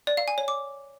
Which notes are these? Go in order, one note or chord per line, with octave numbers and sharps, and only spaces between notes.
D5
F5
G#5
C#5
D6